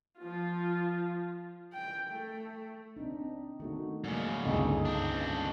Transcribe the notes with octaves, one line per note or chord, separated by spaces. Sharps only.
F3 F4
G5
A3
C4 D4 D#4
D#3 A3 D#4 F#4
G#2 C#3 F#3 A#3 D5
C#2 G2 D3 D#4 G#4 A4
C4 D4